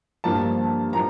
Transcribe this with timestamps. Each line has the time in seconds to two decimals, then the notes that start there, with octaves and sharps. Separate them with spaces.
0.24 G2 F3 A#3 A5
0.93 F3 A#3 A#5